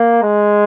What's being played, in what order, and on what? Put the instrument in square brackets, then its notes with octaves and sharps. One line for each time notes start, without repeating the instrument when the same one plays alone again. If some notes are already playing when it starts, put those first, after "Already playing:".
Already playing: [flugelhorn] A#3
G#3